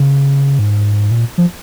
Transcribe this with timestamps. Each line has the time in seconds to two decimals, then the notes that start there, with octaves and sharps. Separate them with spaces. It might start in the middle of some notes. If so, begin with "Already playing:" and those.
Already playing: C#3
0.59 G#2
1.11 A#2
1.38 F3